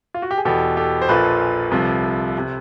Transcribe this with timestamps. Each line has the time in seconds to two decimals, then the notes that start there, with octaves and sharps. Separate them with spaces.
0.14 F4
0.22 F#4
0.31 G4
0.38 G#4
0.45 E2 B2 G4 A4
0.77 G4 A4
1.02 C5
1.09 A#1 A#2 F3 A4 B4
1.71 C2 C3 F3
2.38 C3